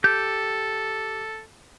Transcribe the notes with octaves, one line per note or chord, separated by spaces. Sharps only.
G4 A4 G6